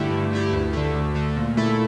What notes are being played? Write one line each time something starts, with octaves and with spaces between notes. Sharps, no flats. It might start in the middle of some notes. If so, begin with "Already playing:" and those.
Already playing: G2 D3 A3 E4 G4
G2
D3 A3 E4 G4
D2
D3 A3
D2
D3 A3
A#2
A3 E4 A4